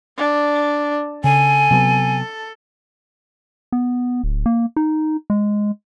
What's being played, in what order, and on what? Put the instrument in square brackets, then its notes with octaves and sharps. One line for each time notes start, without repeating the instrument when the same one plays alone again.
[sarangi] D4
[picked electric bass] C#3 [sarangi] A4 [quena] G#5
[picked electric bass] C3 F#3 B3
[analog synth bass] B3
D1
A#3
D#4
G#3